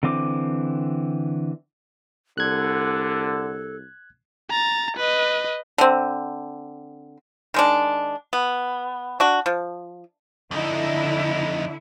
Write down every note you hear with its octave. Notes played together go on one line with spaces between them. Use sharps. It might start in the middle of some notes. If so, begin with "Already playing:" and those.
D3 E3 C4 D6
C2 D3 A4 F#6 G#6
A#5 A6
B4 D#5
D3 C4
D#3 G#3 D4
B3
D4 F#4
F3
F2 D3 D#4 E4